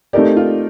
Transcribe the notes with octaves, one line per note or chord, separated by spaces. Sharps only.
A3 C4 D#4 G4 A#4 D5
F4